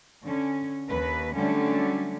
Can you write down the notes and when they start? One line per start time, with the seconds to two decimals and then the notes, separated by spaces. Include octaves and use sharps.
0.24 D3 C#4
0.88 D#2 B4
1.34 D3 F#3 G3 A3 C#4